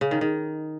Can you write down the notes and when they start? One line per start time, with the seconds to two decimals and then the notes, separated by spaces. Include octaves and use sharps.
0.01 C#3
0.11 D#3
0.21 D#3